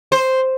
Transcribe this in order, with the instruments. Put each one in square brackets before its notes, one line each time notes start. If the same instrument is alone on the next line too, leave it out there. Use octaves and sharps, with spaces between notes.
[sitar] C5